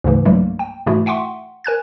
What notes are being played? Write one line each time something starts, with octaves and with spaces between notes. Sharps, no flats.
D2 G#2 C#3 E3
C2 G2 F#3 G3 A3 A#3
G5
G#2 B2 E3 A3 E4 F#4
E5 F#5 G5 C6 C#6
A#4 G#5 F#6 G#6